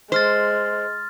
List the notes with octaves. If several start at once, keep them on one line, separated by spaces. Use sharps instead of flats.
G#3 C5 C6 F6 A6